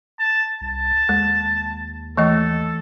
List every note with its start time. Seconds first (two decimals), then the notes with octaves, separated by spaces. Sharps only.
0.20 A5
0.61 C2 A5
1.09 D#2 G#3
2.17 E3 A3 A4 D#5